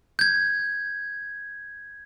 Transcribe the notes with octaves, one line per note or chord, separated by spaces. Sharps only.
G6 G#6